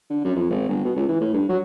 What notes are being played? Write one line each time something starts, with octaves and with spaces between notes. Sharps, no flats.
D3
F#2
F2
G#1
G1
B2
C#2
E3
A2
G2
F#3